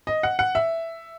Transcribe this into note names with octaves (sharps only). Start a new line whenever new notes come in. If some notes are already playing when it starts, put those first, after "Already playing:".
D#5
F#5
F#5
E5